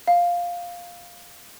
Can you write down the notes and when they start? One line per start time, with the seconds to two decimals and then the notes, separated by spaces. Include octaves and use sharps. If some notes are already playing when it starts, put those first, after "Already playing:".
0.07 F5